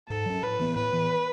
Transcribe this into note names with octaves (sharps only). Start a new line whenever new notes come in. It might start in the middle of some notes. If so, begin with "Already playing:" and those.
G#2 A4
F#3 C#4
A2 B4
E3 B3
A2 B4
E3 B3